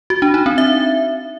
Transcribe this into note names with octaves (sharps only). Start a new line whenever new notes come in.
F#4
D4
D#4
C4
E5